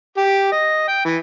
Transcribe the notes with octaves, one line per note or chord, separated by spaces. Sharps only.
G4
D#5
G5
E3